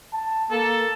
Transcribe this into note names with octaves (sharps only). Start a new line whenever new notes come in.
A5
A#3 A4